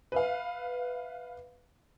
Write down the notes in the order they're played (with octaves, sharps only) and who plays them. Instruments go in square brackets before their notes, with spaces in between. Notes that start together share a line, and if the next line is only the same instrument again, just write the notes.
[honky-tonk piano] B4 E5 F5